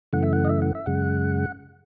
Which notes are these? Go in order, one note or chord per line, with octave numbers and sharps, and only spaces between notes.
F#2 C#3 E3 A3 F#5
E5
F#5
D#5
E5
F#5
E5
F#2 C#3 G#3 F#5